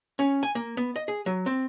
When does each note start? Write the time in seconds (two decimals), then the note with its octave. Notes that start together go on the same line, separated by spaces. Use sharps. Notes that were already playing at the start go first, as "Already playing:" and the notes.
0.19 C#4
0.43 G#5
0.55 A#3
0.77 B3
0.96 D#5
1.08 G#4
1.26 F#3
1.46 C4